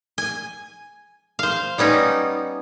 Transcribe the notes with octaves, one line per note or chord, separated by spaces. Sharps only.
G#5
C5 F5
G3 B3 C#4 D#4